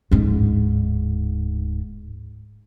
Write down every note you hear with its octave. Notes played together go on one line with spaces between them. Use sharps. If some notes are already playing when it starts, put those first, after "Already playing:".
D1 G#2